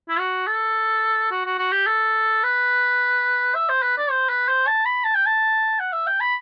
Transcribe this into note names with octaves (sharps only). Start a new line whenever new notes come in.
E4
F#4
A4
F#4
F#4
F#4
G4
A4
B4
E5
C5
B4
D5
C5
B4
C5
A5
B5
A5
G5
A5
F#5
E5
G5
B5